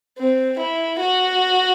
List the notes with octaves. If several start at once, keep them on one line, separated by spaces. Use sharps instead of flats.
C4
E4
F#4